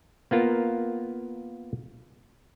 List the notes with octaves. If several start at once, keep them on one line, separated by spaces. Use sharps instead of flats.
A#3 B3 F4 A#4